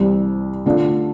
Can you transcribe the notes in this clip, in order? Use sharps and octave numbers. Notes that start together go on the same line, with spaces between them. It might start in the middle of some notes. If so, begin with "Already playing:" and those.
Already playing: C2 C3 E3 G3
D3 A3 D4 F4